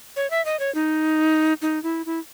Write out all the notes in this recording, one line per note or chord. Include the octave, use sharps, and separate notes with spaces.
C#5
E5
D#5
C#5
D#4
D#4
E4
E4